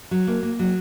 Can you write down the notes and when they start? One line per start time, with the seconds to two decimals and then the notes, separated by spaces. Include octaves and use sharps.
0.11 F#3
0.27 A#3
0.43 A#3
0.59 F#3